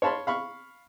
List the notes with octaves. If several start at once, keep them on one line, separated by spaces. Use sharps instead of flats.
C#5 F5 A5 B5 C6
F5 B5 C#6